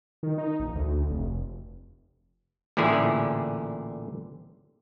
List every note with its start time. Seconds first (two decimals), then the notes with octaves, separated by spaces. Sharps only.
0.23 D#3
0.38 D#4
0.60 A#1
0.75 D2
1.11 F1
2.77 A1 A#2 D3 E4 G#4